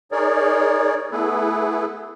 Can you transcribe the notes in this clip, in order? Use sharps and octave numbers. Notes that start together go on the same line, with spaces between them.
D#4 G#4 A#4 C#5 D5
A3 B3 E4 G#4 A4 B4